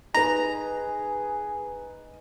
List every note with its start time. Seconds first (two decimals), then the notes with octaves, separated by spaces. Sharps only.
0.14 D#4 G#4 B4 A#5